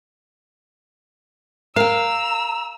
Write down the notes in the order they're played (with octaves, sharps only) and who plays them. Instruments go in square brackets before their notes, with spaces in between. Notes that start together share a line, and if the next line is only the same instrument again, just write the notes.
[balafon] A#4 [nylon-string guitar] F5 G5 [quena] A#5 [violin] E6